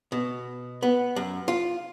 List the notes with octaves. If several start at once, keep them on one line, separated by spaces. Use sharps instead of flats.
B2
B3
F#2
F4